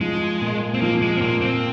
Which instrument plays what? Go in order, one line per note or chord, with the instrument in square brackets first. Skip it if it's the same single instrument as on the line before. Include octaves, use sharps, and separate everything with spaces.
[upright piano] F3 [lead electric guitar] G#3
[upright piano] A#2
[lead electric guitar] C4
[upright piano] F3 [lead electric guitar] A#3
[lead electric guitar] G#3
C4
[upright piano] A#2 [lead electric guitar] A#3
[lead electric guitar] C4